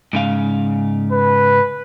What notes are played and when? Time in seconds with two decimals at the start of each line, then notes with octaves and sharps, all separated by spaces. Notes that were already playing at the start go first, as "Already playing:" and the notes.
0.13 G#2 C#3 F5
1.12 B4